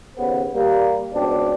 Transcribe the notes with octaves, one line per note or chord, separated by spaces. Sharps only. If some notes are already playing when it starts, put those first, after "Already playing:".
D#2 C#3 B3 C4
G3 A#3
C#2 B2 C4 D4